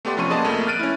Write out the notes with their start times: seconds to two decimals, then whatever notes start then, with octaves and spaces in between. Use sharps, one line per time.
0.05 A3 B3 G4 D5 C6
0.17 C3 F3 C#4 C6 C#6 D#7
0.30 A#3 B3 G#4 D5 D#5 A5
0.44 F2 A3 A#3
0.67 F6 F#6 A6 D7 D#7
0.79 C#4 E4